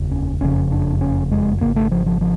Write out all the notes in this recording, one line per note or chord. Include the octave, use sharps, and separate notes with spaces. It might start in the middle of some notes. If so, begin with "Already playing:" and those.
Already playing: F1 D#2 C#3
C#4
F#1 F2 C#3 C#4
D4
C#4
G#3
G#1 F#2 C#3 A#3
A3
F3
F3
F3